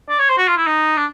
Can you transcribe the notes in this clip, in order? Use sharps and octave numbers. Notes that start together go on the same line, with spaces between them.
D5
C#5
C5
F#4
F4
E4
D#4
D4